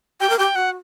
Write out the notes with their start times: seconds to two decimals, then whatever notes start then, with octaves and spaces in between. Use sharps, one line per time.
0.20 G4 G5
0.30 A#4
0.38 G4 G5
0.55 F#4 F#5